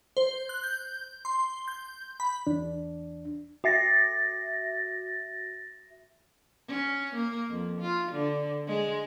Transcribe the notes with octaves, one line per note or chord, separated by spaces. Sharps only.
C5
F#6
G6
C6
G6
B5
E2 D4
F#4 E5 A6 A#6
C#4
A#3
F2
F4
D3
G#3